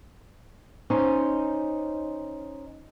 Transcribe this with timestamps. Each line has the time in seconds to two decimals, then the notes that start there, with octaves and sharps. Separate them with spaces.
0.90 C#4 D#4 C5